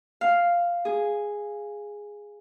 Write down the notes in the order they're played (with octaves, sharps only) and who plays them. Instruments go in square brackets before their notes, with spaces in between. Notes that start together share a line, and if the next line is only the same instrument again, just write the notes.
[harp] F5
G#4